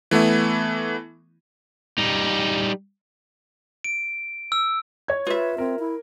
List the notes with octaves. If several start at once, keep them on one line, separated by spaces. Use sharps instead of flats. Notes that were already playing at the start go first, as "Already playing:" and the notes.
E3 A3 B3 E4
G3 D#4
D7
E6
C#5 G#6
F4 B4 E5
C4 A#4
E4